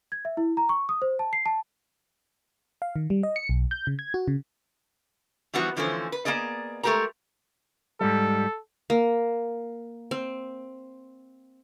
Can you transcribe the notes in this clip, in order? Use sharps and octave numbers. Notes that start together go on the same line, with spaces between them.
G#6
E5
E4
A#5
C#6
D#6
C5
A5
C7
A5
F5
D#3
G3
D#5
C#7
B1
G6
C#3
G#6
F#4
C#3
E3 F3 G3 B3 F#4
D3 E3 F3 A3 C#4 C5
B4
A#3 B3 G#4 D5 D#5
G#3 A3 C#4 G4 A#4 A#5
G#2 G3 A4
A#3
C4